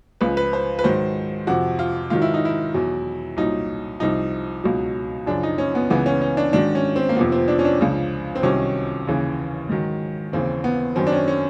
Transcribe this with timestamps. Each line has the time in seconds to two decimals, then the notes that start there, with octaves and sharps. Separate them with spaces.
0.21 C#2 C#3 F3 B4
0.37 B4
0.53 C5
0.79 B4
0.84 G#2 D#3 F#3 C5
1.47 F2 C3 F3 F#4
1.79 F4
2.10 G#2 D#3 F#3 F4
2.22 E4
2.34 D#4
2.45 E4
2.74 E2 B2 F#3
3.37 C2 A#2 F#3 D#4
4.00 C2 C3 F3 D#4
4.64 C#2 B2 F#3
5.27 F#2 C#3 F3 D4
5.43 D#4
5.58 C#4
5.75 B3
5.90 C#2 C#3 E3 B3
6.06 C#4
6.21 C#4
6.37 D4
6.53 G#2 D#3 F#3 D4
6.75 C#4
6.96 C4
7.09 A#3
7.16 F2 C3 F3 B3
7.32 C4
7.48 D4
7.59 C#4
7.65 D4
7.80 C#2 C#3 F3
8.35 C4
8.43 C2 C3 D#3 F#3 C#4
9.07 D#2 C#3 E3
9.69 G#2 D#3 F#3
10.33 D#2 C#3 E3 C4
10.64 B3
10.96 F#2 D#3 F#3 C4
11.07 D4
11.12 C#4
11.28 C#4